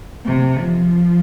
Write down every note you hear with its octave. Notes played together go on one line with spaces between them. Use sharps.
C3
F3